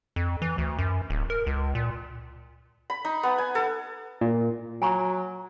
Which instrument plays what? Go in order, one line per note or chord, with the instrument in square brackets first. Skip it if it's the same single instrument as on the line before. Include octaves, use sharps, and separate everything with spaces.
[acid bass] F2
E3
D2
F#2
D1
A#4
C#2
A#2
[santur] B5
D#4
B3
G#5
A4
[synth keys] A#2
[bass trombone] F#3 [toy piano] G#5 A#5 C#6